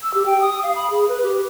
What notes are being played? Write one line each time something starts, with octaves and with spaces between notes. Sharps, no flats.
E6
G4
G5
D#6
F5
B5
G#4
B4
G4